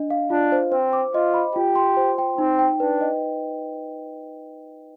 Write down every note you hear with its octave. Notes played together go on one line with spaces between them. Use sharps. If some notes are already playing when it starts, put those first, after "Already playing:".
Already playing: D4 D#5
F5
D4 F4
C5
C4 C5
D6
F4 D#5
B5
F4 G4
C6
C5
G5
C4 D#4
G5
D4 B4
D#5